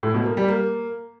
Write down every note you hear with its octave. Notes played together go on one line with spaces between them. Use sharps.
A2
B2
A#3
G3
A#3